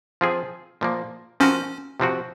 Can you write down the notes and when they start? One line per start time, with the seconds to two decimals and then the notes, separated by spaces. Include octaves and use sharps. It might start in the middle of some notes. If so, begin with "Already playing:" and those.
0.21 F3 C4 F4 G#4
0.81 A#2 F3 A#3
1.40 F3 C4 C#4 F#4 A#4
2.00 C3 F3 C4 F#4